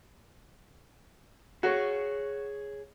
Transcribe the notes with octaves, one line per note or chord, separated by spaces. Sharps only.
F#4 G#4 C#5